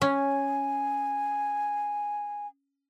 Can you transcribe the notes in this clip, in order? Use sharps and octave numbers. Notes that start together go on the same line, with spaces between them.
C#4 G#5